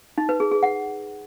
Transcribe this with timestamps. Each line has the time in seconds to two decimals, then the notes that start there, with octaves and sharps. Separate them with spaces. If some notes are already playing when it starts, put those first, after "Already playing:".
0.18 D#4
0.29 B4
0.40 G#4
0.51 G#4
0.63 F#5